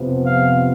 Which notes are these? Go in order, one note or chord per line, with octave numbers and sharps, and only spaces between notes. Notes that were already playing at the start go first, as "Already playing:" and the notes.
Already playing: F2 C3 F3 B3
F5